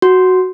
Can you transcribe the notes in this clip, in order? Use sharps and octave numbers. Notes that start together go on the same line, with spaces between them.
F#4